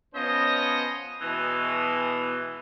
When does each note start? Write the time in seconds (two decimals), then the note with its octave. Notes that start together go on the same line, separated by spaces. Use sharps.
0.14 F3 B3 C#4 C5 C#5 D#5
1.22 B2 E3 G#3